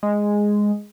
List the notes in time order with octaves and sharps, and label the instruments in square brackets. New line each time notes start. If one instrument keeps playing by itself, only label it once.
[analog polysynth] G#3